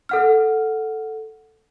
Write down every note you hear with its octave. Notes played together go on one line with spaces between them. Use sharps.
A4 F#5 F6